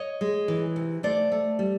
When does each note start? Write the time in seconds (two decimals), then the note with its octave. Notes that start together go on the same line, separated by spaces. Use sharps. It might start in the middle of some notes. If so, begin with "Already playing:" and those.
Already playing: C#5 D#5
0.21 G#3
0.48 E3
0.76 C3
1.03 A3 C5 D5
1.32 A3
1.59 G3